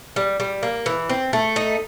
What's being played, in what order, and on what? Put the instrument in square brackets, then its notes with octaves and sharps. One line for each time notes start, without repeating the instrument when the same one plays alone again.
[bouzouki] G3
G3
A#3
E3
C4
A3
D#4